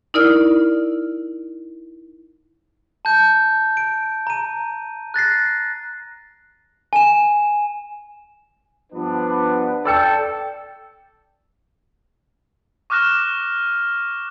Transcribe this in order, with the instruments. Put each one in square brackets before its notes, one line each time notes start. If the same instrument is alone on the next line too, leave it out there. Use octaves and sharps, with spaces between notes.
[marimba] D#4 E4 A#4 D5 F6
[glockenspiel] A5 G6
D7
A#5 D#7
F#6 A6 A#6 C7
G#5 E7
[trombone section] G2 F3 B3 [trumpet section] D4 B4
[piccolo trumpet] A4 [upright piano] D5 E6 C#7 [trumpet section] G5
[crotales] C#6 D6 F6 F#6 A#6 E7